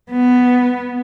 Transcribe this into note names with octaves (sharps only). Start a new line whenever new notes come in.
B3